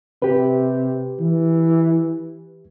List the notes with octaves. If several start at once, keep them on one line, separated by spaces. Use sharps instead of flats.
C3 G4 B4
E3